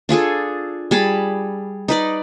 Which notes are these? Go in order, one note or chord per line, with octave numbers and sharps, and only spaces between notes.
D4 F4 G#4 A4
G3 G#4 A5 B5
D#4 B4 D5